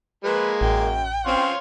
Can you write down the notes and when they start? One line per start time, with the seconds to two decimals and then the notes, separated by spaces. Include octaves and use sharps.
0.24 F3 G#3 A#3 B4
0.61 A1 F#2 G5
1.26 C4 C#4 C#5 F5 C6